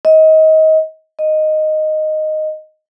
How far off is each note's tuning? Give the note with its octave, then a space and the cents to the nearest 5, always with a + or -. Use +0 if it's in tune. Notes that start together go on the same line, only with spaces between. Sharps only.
D#5 +25
D#5 -5